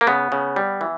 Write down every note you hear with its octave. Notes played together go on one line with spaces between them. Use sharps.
A#3
C#3 B3
C#3
G3
E3